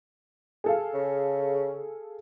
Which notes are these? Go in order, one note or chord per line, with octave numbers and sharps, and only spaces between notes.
G#4 A4 F5
C#3